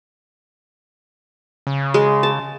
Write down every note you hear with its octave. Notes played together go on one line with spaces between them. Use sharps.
C#3
G#3
A5